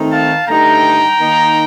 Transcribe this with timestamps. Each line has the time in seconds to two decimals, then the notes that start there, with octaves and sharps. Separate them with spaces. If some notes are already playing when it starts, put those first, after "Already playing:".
Already playing: D#3 A3 C4 D#4
0.11 F5 A5
0.46 G2 D3 A3 D#4 G5 A#5
1.19 D#3 A#3 D#4